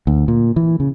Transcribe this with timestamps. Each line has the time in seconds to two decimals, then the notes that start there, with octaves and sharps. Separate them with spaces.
0.07 D2
0.28 A#2
0.56 E3
0.80 C#3